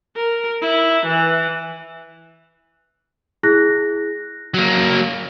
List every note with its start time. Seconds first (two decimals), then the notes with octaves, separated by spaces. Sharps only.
0.16 A#4
0.62 E4
1.06 E3
3.43 E4 G#4 F#6 A#6
4.54 F#3 A#3